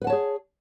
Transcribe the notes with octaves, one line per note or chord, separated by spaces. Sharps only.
G#4 B4 C#5 F#5 A5